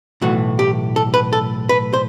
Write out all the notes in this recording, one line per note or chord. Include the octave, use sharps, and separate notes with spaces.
B1 A2 E3 A3 F#4
G4
A4
B4
A4
B4
C5